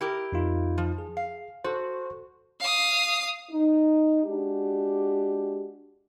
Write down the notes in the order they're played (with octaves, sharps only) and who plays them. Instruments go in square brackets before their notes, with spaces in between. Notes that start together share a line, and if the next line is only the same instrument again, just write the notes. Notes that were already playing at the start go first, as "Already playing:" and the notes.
[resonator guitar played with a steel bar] E4 G4 A#4
[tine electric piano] F2 D#4 F4
[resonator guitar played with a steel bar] F3
[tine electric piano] G#4
[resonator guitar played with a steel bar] F5
[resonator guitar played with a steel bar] F#4 [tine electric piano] A4 C5
[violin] F5 D#6
[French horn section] D#4
G#3 D4 F#4 G4